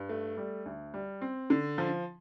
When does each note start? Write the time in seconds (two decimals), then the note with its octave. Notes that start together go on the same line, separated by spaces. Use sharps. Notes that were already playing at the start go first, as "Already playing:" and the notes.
Already playing: G2
0.09 A3
0.37 G3
0.66 D2
0.94 G3
1.21 C4
1.50 D3
1.78 F3